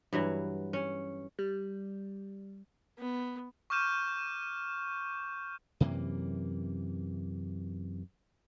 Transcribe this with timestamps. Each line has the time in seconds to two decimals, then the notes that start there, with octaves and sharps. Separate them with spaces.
0.13 G2 E3 F#3
0.73 C#4
1.39 G3
2.98 B3
3.70 C#6 D6 F6 G6 D#7 E7
5.80 F#2 C3 E3 A#3